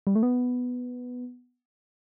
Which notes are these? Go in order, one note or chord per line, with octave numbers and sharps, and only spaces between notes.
G3
A3
B3